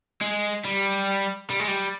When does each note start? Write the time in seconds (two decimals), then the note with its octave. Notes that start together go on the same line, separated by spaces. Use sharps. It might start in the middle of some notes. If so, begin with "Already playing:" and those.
0.22 G#3
0.65 G3
1.50 G3
1.60 G#3
1.68 G3